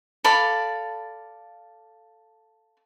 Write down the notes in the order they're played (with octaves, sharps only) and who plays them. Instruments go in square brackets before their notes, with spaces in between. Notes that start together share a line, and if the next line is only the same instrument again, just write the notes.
[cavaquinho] A4 D5 F5 B5